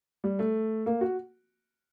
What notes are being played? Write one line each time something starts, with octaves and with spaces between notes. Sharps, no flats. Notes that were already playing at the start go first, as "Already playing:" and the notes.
G3
A3
A#3
F#4